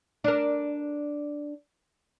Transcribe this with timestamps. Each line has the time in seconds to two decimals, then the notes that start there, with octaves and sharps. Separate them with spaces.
0.24 D4 A#4